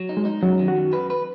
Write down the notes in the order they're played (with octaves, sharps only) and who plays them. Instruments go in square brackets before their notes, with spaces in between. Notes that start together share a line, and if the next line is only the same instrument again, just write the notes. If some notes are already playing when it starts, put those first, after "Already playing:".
Already playing: [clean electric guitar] F#3
D#4
[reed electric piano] G#3
[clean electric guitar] D#4
[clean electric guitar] F#2 [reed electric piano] F#3
[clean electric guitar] D#3
[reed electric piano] F#4
[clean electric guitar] F#2
B4
B4